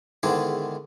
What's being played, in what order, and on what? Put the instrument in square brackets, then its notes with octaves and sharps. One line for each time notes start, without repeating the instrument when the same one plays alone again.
[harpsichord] E2 G#2 D3 D#3 D4 G#4